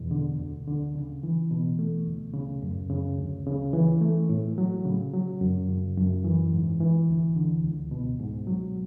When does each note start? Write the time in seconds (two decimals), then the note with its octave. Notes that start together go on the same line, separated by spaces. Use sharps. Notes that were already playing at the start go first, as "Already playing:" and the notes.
Already playing: E2 B2
0.11 D3
0.39 D2
0.68 D3
0.95 C#3
1.23 E3
1.51 B2
1.79 A3
2.06 D2
2.34 C#3
2.63 F#2
2.90 C#3
3.19 D2
3.46 C#3
3.73 E3
4.01 A3
4.29 A2
4.58 F#3
4.85 C#3
5.13 F#3
5.41 F#2
5.69 C#3
5.97 F#2
6.24 E3
6.52 G#2
6.80 E3
7.08 D2
7.36 D3
7.64 C#2
7.91 B2
8.19 G#2
8.47 F#3